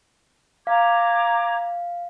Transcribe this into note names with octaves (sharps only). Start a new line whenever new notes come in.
F5 A#5 D6 G#6